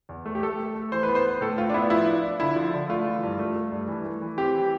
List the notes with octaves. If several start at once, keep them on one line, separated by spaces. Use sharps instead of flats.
E2
A3
G4
A3 A4
A3
A3
E3 C5
B4
B3
C5
B3
A2 A4
A2 F4
D4
B3 E4
F3 E4
D4
D4
D3 E4
F3
D3
A3 F4
E3
G2
A3
A3
G2
E3
A3
E3
C4 G4
E3